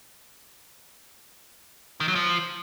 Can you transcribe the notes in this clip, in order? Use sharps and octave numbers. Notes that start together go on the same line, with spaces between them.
D#3
F#3
F3